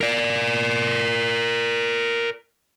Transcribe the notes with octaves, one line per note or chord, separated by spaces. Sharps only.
A#4 D5